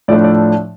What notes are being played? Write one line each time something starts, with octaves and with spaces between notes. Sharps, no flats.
A2 F3 A3 D4 D5
D5